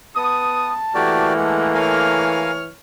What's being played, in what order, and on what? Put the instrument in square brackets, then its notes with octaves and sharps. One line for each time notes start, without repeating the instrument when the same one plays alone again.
[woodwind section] B3 D#6 [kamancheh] A5
[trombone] E3 [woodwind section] A3 A#3 [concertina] F#4 G4 D5
[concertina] G#3 F#5
[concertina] A#4 F5 G#5 [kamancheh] C#5 F6